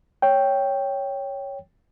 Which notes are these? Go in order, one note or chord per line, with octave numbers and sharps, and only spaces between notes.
C#5 G5